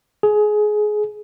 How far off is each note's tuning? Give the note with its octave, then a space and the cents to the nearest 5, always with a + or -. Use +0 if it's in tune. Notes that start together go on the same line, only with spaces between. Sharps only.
G#4 +20